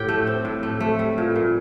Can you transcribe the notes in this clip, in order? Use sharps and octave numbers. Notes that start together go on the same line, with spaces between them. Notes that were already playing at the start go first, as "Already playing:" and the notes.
Already playing: A2 G4 G5
A3
C4
A2
A3
A3
G3
A#2
A#2